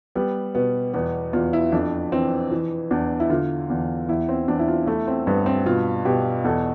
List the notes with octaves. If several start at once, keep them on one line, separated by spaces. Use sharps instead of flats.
G3 B3
B2 B3
E2 B3
E2 F4
E4
F2 D4
E3 C4
E3
E2 D4
E4
D3 F4
E2
E2 E4
C4
E2 D4
E4
F4
A3 E4
C4
G2 B3
C4
B2 F4
B2 G4
E2 A4